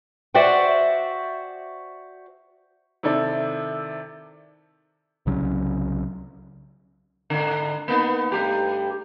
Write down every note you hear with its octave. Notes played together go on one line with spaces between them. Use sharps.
F#4 C5 D5 E5 F#5 G5
C3 D#3 E4 A4 D5
C2 C#3 F#3 C#4
G#2 D3
A#3 B3 D#4
G2 A3 G4